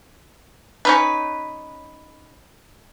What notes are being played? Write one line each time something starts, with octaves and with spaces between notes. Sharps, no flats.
C#4 D#4 B4